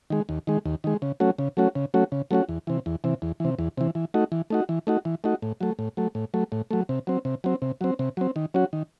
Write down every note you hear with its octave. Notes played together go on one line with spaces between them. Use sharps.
D#3 G#3
D#2
D#3 G#3
D#2
D#3 G#3
C#3
F#3 A3 C#4 F#4
C#3
F#3 A3 C#4 F#4
C#3
F#3 A3 C#4 F#4
C#3
F#3 A3 C#4 F#4
E2
C3 E3
E2
C3 E3
E2
C3 E3
E2
C3 E3
E3
A3 D#4 F#4
E3
A3 D#4 F#4
E3
A3 D#4 F#4
E3
A3 D#4 F#4
A2
F#3 A3
A2
F#3 A3
A2
F#3 A3
A2
F#3 A3
C3
F#3 C4
C3
F#3 C4
C3
F#3 C4
C3
F#3 C4
D#3
F#3 C#4 F#4
D#3